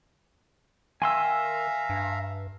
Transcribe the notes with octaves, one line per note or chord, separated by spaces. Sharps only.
D#3 E5 F5 G#5 A#5 C6 E6
G2